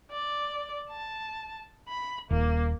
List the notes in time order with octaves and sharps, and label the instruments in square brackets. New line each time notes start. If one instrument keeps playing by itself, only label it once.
[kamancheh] D5
A5
B5
[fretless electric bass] D#1 [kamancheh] A#3